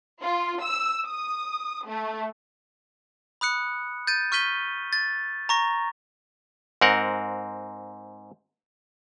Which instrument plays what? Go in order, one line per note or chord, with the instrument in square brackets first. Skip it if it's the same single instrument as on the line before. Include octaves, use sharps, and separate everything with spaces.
[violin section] F4
E6
D#6
A3
[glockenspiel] B5 D#6 F#6 C#7
G6 A6 D#7
C#6 F6 G6 B6 D#7 G7
A6
A#5 C#6 A#6
[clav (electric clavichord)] G#2 C4 A#4 F#5